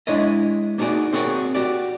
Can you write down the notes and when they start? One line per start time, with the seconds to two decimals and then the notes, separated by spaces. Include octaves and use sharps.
0.07 G#3 D4 E4 C#5 D#5
0.78 A#3 B3 D#4 F#4 G#4 D5
1.13 C4 F#4 G#4 A#4 C#5
1.55 F#4 G4 D5